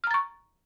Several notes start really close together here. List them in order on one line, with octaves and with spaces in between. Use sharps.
F6 A#5 A6 C#6